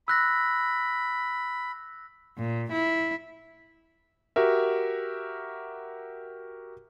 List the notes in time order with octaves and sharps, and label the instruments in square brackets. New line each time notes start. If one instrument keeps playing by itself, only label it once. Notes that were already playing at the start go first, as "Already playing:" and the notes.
[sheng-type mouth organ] B5 [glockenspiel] E6 F#6 A#6
[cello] A#2
E4
[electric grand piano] F#4 G4 A#4 E5